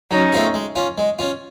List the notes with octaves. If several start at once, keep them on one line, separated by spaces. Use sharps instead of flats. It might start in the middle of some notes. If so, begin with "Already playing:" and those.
F#3 C#4 D#4
A3 C4 F4 G#4
G#3
C#4 F4
G#3
C#4 F4